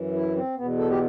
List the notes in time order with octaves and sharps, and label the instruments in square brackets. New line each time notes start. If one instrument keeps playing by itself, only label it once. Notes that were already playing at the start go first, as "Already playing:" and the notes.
Already playing: [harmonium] F#2 E3
E4
C4
E2 B2 B3
A4
G4